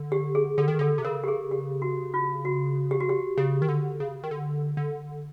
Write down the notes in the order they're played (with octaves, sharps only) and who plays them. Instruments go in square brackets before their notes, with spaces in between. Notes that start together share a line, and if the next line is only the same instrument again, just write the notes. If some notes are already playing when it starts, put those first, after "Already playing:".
Already playing: [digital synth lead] D3
[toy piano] G4
G#4
[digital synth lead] D3 [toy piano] A4
[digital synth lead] D#3
[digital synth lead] D3 [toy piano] A4
[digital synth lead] C3
[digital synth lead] C#3 [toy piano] A#4
[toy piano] G4
G#4
G4
F#4
F4
F#4
G4
F#4
G4
[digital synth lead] C#3 [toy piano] G4
[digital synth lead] D#3
D3
C#3
D#3
D3
D3